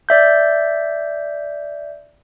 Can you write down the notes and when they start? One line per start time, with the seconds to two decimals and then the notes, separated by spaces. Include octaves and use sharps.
0.09 D5 E5 G6